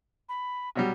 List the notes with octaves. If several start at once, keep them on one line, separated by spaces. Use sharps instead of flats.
B5
B2 F#3 G3